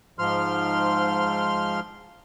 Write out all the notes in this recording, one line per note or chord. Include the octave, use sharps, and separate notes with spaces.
G#2 F3 C6 F6